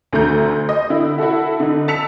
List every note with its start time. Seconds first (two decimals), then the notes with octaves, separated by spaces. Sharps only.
0.13 D2 D3 A3 A#5 G6
0.69 D#5
0.90 D3 E4
1.18 E4 F#4 A4 E5
1.60 D3 D#4
1.88 A5 E6 B6 C#7 F7